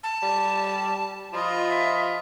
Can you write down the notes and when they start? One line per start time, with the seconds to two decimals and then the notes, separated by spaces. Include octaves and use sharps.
0.03 A5
0.22 G3
1.33 F3 F4 D#5 B5
1.70 E5